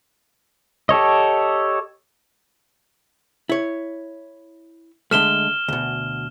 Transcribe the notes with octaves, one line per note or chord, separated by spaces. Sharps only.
G4 A4 C#5 D#5
E4 C#5
D3 G#3 A3 F6 E7 G7
D2 B2